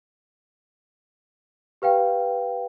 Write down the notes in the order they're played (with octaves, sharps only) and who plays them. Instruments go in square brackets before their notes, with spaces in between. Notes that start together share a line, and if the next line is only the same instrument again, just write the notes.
[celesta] G4 B4 F5 G5